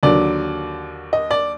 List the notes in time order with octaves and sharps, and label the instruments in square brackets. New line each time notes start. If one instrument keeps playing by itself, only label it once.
[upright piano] D#2 D3 F#3 D5
D#5
D5